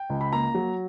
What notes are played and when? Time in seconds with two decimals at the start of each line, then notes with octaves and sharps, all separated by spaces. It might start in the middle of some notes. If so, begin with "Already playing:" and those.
Already playing: G5
0.10 C#2
0.21 B5
0.33 A#3 A#5
0.55 F#3